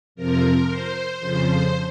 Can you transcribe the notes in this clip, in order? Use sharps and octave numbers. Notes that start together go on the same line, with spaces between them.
F2 C3 F3 A#4
C5
F2 C#3 F3 C5